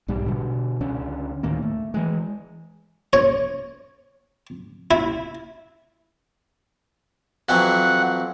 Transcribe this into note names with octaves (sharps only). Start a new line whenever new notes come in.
B1 G#2 G3
B2 D3
C#2 D3 C#4
D2 A2 D#3 A#3
A3
E3 G#3
C#5
E4
F2 E3 F#3 F#5